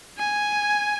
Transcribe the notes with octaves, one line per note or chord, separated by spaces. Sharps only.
G#5